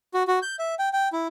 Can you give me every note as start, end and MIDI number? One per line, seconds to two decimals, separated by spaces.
0.14 0.23 66
0.28 0.39 66
0.42 0.56 91
0.59 0.75 76
0.79 0.89 79
0.93 1.08 79
1.13 1.27 64